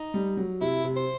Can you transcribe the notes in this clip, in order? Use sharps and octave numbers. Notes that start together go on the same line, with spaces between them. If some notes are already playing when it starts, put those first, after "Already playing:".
Already playing: D#4
G3
F#3
C3 E4
C3
C5